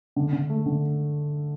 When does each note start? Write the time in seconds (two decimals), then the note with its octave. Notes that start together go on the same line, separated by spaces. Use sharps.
0.16 D3
0.33 D3
0.49 A3
0.66 D3